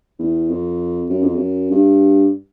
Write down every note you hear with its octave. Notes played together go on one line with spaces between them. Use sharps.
E2
F2
F#2
F2
F#2
G2